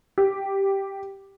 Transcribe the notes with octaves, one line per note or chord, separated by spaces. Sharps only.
G4